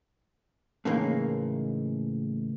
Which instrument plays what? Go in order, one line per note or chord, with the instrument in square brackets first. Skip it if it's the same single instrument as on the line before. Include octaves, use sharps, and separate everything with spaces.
[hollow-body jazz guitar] A2 C#3 E3 G#3 A#3 D#4